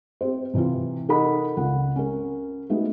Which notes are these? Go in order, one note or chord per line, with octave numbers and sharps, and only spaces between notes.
C4 G4 C5
C3 E3 C4 F4
D#4 A4 A#4 D#5 F#5 B5
C#2 F4 F#5
C#4 A#4
G#3 A3 B3 D#4 F#4